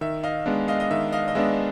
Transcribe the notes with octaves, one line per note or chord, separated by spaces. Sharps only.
D#3 E5
D#5 F5
G#3 B3 D4
D#5 F5
D#5
D#3 E5
D#5 F5
D#5
G#3 B3 D4 E5